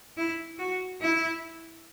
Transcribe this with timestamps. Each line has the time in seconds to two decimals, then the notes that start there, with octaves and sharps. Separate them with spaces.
0.17 E4
0.59 F#4
1.02 E4